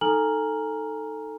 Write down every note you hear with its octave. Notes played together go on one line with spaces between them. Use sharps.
D#4 A4 G#5 A#5 F6 F#7